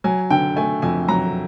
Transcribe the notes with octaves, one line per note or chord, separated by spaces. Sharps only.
F#3 G#5
D3 G5
A3 G#5
F2 G#5
F#3 A#5